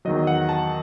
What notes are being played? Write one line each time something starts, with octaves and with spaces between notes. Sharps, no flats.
E2 D#3 F#3 D#5
F#5
A5